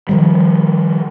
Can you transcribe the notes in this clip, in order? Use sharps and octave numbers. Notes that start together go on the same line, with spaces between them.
D#3 F3 G3